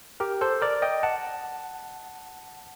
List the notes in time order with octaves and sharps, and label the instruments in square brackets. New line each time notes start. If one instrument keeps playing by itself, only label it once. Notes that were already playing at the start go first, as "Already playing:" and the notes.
[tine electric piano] G4 A#4
A4 C5
A#4 D5
D#5 G5
F#5 A5